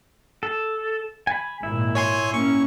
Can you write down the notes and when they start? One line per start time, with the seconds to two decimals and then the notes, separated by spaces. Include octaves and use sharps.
0.43 A4
1.27 G#5 B5
1.63 G#1 A#2 E4
1.95 C#5 G#5 C6
2.34 A#3 C#4 C#6